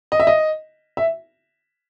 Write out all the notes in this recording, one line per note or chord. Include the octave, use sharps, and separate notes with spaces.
D#5
E5
D#5
E5